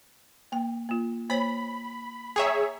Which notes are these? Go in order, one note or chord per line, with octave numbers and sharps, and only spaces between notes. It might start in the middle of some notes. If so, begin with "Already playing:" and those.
A#3 G5
A#3 F4
A#3 C5 C#5 B5
G#4 C#5 E5 G5 A#5